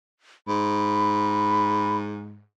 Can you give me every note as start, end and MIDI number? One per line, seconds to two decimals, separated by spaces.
0.48 2.42 44
0.48 1.97 83